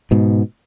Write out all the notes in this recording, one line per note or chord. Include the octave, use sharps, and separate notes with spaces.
G#2 B2